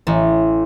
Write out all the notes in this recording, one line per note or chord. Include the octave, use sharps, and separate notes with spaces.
A1